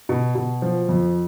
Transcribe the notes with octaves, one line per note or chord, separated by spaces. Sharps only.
B2
B2
F3
F2